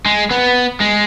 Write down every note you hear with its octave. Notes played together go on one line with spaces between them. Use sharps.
G#3
B3
G#3